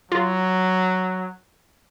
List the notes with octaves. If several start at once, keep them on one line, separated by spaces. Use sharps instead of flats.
F#3 F4